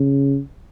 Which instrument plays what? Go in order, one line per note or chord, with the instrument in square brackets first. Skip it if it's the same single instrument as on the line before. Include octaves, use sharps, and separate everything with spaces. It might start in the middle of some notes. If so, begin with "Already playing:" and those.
Already playing: [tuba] C#3